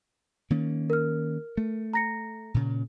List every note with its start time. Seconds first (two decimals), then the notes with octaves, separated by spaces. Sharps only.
0.50 D#3 A#3 C#4
0.90 A#4 F6
1.57 A3
1.94 A#5 A#6 C#7
2.54 A#2 C#3